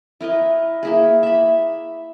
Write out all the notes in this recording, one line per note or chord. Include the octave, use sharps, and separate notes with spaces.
E4 A#4 B4 D#5
A#3 E4 G#4
E5 B5